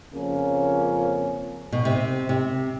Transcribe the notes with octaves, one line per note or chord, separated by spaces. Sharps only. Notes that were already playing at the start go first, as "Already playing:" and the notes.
F2 C#3 F3 A#3 C#4
B2
C3
C3